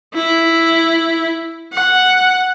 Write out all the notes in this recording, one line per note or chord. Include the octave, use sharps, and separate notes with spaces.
E4
F#5